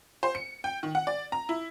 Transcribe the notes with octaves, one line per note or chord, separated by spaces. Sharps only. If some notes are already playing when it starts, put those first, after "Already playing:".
C5
C#7
G5
D#3
F#5
D5
A#5
E4